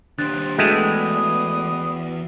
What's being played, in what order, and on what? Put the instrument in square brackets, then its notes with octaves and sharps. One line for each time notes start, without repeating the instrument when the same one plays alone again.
[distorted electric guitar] D#2 G3 [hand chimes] D4 F#6 A6 [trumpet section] C5
[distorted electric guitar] E2 [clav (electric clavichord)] G#3 A3 [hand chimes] F#4 G5 [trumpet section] B4 D5 D#6